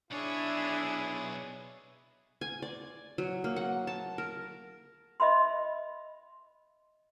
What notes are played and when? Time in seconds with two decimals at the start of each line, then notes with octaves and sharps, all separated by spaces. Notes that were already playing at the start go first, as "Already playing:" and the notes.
0.11 B1 D4 E4 G#4 C#5
2.41 G#5
2.62 D5
3.18 F#3
3.44 A#3
3.56 F#5
3.87 A5
4.18 A#4
5.20 D#5 E5 B5 C6